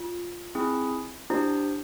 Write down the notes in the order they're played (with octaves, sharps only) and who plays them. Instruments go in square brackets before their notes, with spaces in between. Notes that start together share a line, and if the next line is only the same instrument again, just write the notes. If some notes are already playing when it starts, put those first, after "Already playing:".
Already playing: [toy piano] F4
[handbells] C4 E4 G#4
[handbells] D4 G4 C5 [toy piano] E4